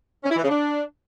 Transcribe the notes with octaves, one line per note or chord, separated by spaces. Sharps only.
C#4
E4
E3
C#3
D4